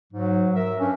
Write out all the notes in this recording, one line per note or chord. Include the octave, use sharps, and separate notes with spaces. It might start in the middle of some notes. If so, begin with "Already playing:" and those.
G#2 F#3
A#4 E5
G2 C#4